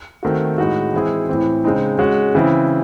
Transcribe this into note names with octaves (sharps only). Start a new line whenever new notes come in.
D#3 A3 C4 F#4
A2 G#3 D#4 F#4
E3 G#3 C4 E4 G#4
A2 E3 C4
C#3 G#3 C4 D#4
G#3 C#4 F#4
C#3 E3 C4 E4